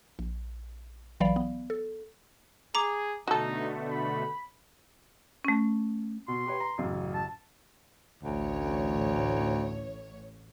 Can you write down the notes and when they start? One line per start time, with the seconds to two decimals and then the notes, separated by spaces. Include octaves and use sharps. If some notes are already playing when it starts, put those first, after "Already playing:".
0.19 A#1
1.20 A#1 E3 F#3 D5 F5 B5
1.36 B3
1.70 A4
2.75 G#4 A#5 D6
3.28 B2 D3 A3 D#4 F#4 A4
3.91 B5
5.45 A3 C#4
6.28 B2 C6
6.46 G4 B4 C#5
6.60 A#5
6.78 A1 F#2 C#3
7.15 A5
8.23 A1 D2 C#5